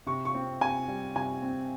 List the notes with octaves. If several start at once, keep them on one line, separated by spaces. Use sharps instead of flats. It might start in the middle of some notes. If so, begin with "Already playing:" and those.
C3 C#6
C#6
C4
C3 G#5
G3
C3 G#5
C4